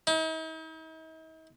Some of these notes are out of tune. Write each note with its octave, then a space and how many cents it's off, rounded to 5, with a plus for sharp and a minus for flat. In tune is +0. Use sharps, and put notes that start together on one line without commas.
D#4 +45